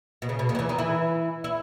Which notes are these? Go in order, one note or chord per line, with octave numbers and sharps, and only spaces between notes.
B2
C#3
B2
D#2 D#3
F#3
E2 E3
D#3 D#4
E3 E4
E4